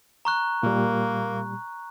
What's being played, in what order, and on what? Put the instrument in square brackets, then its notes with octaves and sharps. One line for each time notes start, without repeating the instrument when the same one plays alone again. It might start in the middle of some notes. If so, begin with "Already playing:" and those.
[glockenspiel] A#5 C#6 F#6
[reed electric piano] A#2 G3 [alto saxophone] A#3